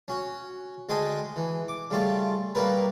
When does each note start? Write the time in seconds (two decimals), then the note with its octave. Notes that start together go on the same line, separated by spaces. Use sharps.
0.08 C#4 F#4
0.89 D2 G#3 G#4 A4 D#5 G5
1.36 E3
1.68 D6
1.91 C#3 G3 A3 F4 A4
2.55 A2 G3 A#3 B3 A#4 B4